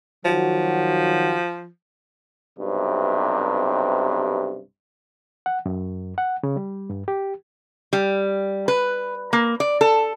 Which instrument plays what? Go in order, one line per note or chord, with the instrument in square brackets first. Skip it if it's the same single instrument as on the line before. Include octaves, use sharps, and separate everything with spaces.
[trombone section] D#3 F#3 F#4 [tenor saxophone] F3
[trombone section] B1 G2 C3
[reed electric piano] F#5
F#2
F#5
C#3
G3
G2
G4
[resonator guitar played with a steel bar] G3
B4
A#3
D5
A4